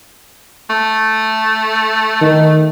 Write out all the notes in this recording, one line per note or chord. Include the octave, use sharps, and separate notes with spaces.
A3
D#3